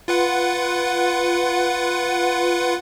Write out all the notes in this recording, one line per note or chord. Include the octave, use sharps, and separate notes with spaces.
F4 B4 F#5